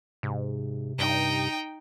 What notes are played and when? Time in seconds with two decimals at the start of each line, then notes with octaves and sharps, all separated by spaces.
0.23 G#2 C3
0.98 G2 D#4 G5